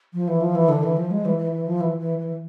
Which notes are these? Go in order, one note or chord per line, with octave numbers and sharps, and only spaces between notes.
F3
E3
F3
E3
D3
E3
F3
G#3
E3
E3
E3
F3
E3
E3
E3